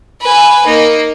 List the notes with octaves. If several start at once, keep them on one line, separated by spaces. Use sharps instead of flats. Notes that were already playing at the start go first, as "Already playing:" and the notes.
B4 G#5
A#3 D#4